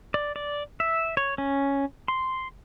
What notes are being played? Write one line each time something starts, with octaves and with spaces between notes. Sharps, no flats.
D5
D5
E5
C#5
C#4
C6